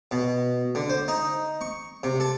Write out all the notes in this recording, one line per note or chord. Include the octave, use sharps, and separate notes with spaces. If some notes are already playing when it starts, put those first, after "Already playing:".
B2
D3
C5
D#4
C#6
C3
A4